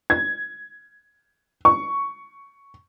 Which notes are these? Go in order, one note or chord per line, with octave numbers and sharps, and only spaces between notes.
G#6
C#6